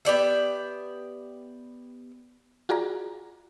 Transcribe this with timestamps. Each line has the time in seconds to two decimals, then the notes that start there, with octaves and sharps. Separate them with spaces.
0.05 B3 G4 D5 E5
2.69 F4 F#4 G#4 D5 A#5